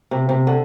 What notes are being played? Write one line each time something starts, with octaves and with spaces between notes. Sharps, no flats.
C3
C3
D3